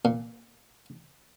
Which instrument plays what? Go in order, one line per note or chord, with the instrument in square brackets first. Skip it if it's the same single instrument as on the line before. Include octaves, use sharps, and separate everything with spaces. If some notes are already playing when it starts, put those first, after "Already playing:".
[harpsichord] A#2